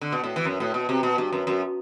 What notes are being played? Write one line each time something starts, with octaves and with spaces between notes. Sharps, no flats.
D3
B2
A2
E3
F#2
A2
B2
C3
B2
G2
F#2
F#2